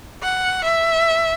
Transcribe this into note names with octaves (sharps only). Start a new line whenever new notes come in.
F#5
E5